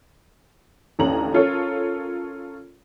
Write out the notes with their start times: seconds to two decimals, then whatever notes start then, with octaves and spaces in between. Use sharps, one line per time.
0.99 A1 D#2 D3 C#4 A#5 F#7
1.34 C#4 F4 A4 A#4 C#5